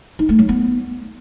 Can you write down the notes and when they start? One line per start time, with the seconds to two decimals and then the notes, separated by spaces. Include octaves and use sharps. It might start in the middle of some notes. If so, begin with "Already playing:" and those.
0.19 D#4
0.29 A3
0.39 F#3
0.49 B3